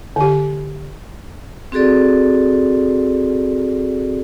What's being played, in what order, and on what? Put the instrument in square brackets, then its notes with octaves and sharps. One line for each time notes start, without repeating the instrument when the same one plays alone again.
[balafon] D3 G4
[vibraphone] C4 F#4 G#4 A4 D5